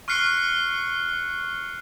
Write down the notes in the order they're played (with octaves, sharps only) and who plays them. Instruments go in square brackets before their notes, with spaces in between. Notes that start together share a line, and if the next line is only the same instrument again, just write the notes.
[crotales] C#6 F6 F#6 C7 C#7 G7